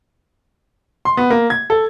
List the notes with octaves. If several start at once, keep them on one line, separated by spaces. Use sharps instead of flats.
C6
B3
A#3
G#6
A4